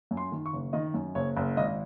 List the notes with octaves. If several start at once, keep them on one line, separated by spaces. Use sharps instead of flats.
F#2
C6
D#3
C#6
F#1
D#3 D#5
F#2
F#1 C#5
F#1
G#1 D#5